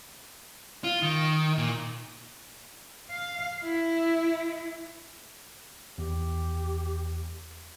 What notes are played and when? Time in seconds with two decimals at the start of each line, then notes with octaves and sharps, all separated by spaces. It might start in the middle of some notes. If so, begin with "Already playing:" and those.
0.84 F4
1.02 D#3
1.58 A#2
3.11 F5
3.64 E4
5.98 E2 G4